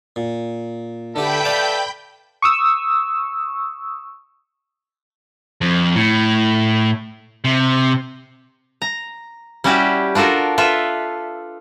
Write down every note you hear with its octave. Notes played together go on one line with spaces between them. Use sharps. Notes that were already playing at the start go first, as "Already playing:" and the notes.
A#2
D3 G4 A4 B4 E5 G5 B5 G6
D5 F5 A5
C#6 D#6 E6
F2
A2
C3
A#5
G3 C#4 E4 F#4 G4
D4 F4 F#4 A4 A#4
F4 A4 B4 E5